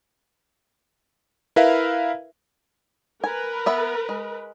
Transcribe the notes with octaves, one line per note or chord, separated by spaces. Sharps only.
E4 A#4 B4 E5 F5
A#4 B4 G#5
B3 E5 B5
G#3